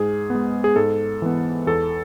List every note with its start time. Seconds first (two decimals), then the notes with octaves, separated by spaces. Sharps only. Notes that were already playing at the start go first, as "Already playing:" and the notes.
Already playing: G#2 G#4
0.30 G#3 B3
0.64 G#4
0.76 G#2 A4
1.22 E3 B3
1.67 E2 A4